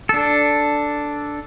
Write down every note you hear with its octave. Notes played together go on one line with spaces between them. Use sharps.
D4 A4